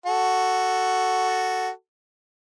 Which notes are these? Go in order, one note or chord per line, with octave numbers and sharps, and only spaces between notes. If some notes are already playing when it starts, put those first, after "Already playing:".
F#4 A4